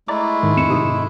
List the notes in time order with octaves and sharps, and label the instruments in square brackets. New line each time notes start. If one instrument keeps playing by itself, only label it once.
[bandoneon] G#3 A3 E4 [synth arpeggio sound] D5 A#5 D6
[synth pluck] G#2 D#3
[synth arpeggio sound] F2 C#7 E7
[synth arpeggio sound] G#2 C3 [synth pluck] D#6